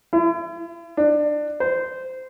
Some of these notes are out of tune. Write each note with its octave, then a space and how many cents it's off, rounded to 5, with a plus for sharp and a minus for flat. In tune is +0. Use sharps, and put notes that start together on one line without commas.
E4 +45
D4 +25
C5 -15